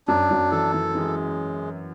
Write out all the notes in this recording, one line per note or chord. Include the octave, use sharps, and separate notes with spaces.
F#2 F#3 D4
F#2 F#3
E3 A4
E3
E3 G#3